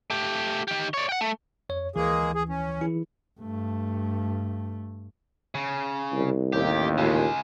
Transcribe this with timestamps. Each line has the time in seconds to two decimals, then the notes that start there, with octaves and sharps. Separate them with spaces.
0.10 A3 G4
0.68 D#3 G4
0.94 C#5 D5
1.09 F#5 G5
1.21 A3
1.69 F2 C#5
1.96 D2 E3 G#3 A#3 G#4
2.35 G#4
2.49 C#4
2.81 E3 E4 G#4
3.40 G2 A3
5.55 C#3
6.12 C2
6.53 A1 D#2 G4
6.98 A#2 C#3 G#3